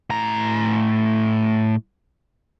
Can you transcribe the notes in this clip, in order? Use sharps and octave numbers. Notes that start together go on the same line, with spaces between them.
A2 A#5